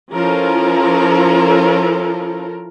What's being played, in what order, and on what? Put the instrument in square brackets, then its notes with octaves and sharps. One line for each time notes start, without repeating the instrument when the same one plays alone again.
[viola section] F3 C#4 E4 F4 A4 A#4